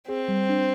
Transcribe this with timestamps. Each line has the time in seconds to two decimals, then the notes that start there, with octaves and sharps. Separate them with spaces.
0.08 C4 G#4
0.28 G3
0.49 D4